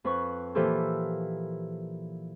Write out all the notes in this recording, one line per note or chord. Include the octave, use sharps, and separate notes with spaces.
F2 B4 C#6
A#2 E3 F3 G4 A4 G6